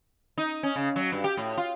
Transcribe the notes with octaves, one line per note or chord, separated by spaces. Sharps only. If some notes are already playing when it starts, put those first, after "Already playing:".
D#4
C#4
C#3
F#3
G2
G4
A2
F4